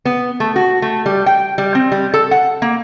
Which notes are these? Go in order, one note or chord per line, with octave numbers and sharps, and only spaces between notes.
B3
A3
F#4
A3
G3
G5
G3
C4
G3
A4
F#5
A#3